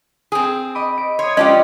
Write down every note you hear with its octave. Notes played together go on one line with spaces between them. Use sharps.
C4 G#4
D#5 B5 D6
D7
C#5 C6 D#6 G#6
G#3 C#4 D4 F4 G4 C5 D#5